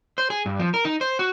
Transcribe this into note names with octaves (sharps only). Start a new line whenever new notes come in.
C5
G#4
G2
F3
A#4
D#4
C5
F#4